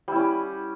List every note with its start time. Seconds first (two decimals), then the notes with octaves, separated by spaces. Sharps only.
0.08 G3
0.12 E4
0.16 C#4
0.20 G4